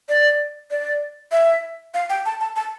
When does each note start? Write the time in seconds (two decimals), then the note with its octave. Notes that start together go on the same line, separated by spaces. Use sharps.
0.09 D5
0.71 D5
1.32 E5
1.94 F5
2.10 G5
2.26 A5
2.40 A5
2.56 A5